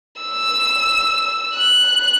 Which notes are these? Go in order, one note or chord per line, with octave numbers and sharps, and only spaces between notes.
E6
F#6